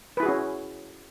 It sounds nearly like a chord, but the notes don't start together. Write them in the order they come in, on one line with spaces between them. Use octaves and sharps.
B4 E4 G#4 F#4 C#4